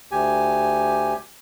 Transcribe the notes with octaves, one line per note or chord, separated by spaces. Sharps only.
D2 G4 G#5